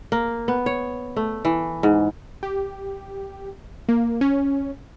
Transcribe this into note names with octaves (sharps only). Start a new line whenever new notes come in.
A#3
B3
C#5
A3
E3
G#2
G4
A#3
C#4